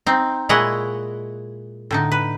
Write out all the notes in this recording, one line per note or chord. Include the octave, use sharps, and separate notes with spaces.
C4 D#4
A#2 G#3 E4 C#5 D#5 F#5
A2 D3 D#4
B4